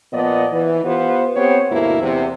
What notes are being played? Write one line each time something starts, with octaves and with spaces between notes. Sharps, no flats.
A#2 F3 B3 D5 D#5
E3
B3 F4 G4 B4 C5
B3 C4 G4 C5 C#5
D2 G2 B2 A#3 E4
E2 C3